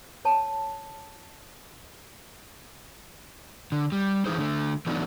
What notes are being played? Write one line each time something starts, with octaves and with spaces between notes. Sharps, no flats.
C#5 A5
D3
G3
E3 D#4 G#4 C5
D3 A3
E3 F#3 A3 B3 D4 D#4